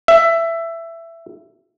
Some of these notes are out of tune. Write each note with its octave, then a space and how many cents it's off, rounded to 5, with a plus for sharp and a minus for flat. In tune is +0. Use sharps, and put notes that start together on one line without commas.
E5 +15